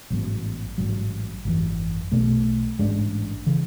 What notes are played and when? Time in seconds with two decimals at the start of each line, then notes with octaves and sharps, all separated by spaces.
0.10 A1 G#2 F#3 B3
0.78 A1 G#2 F#3
1.45 G#1 F#2 C#3 E3
2.12 B1 B2 A3
2.79 A1 G#2 G#3 D4
3.46 C#3 E3